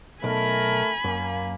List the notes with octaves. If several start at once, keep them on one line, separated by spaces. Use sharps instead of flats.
B1 A3 A#4 G#5 B5
F#2 A#3